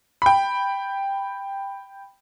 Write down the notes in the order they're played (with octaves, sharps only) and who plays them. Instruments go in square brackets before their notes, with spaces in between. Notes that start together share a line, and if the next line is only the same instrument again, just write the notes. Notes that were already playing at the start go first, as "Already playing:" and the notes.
[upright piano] G5 B5